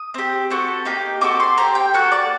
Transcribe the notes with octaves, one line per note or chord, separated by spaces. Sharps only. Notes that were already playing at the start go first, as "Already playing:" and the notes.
Already playing: D#6
C4 G4
C4 F#4 A4
A#3 D#4 G4
C4 F#4 A4 D6
C6
C4 G4 A#5
G5
A#3 F#4 A4 F#5
D5